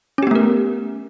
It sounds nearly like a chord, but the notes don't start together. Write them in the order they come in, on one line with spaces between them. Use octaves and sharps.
C#4 G4 B3 A3 A#4